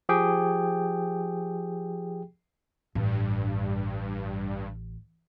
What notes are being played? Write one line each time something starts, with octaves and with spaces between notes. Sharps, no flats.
F3 G4 G#4 G5
A1 G2